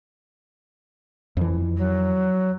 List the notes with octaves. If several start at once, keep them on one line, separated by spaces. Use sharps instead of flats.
F2 E3
F#3